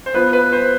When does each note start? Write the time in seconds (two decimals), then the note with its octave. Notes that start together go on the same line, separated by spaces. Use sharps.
0.06 C5
0.14 F3 B3 F4 B4
0.33 B4
0.52 C5